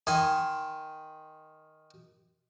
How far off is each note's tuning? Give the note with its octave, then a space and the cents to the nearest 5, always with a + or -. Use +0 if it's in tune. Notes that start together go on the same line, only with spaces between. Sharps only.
D#3 +0 G#5 -10 C6 +0